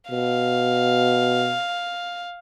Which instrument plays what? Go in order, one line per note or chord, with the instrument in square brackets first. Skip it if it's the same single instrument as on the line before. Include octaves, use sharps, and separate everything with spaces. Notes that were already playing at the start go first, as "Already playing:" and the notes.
[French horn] B2 [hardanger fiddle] F5